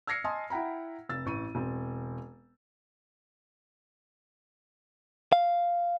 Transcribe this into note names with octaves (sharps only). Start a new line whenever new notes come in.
E6 F6 G#6 A#6 C7 C#7
D#5 G#5 A5 C6 D#6
E4 F#5 G5 A#5 B5
F1 E6 A6
A1 C#6 D#7
E1 C4
F5